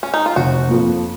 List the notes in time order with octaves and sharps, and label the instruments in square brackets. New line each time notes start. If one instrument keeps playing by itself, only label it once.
[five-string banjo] C#4
D#4
F4
[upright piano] F1 [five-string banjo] F#4
[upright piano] F2 F3 A#3